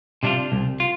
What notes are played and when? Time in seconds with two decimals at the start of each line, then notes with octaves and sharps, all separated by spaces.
0.23 C3 G3 D4 F4
0.52 C2
0.80 F4